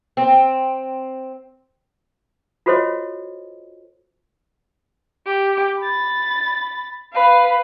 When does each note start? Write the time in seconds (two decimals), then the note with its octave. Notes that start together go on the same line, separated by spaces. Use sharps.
0.17 C4
2.66 F4 F#4 A4 C5 C#5 D#5
5.26 G4
5.79 B5 A6
7.13 B4 F5